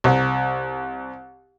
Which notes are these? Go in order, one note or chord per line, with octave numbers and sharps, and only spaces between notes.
C2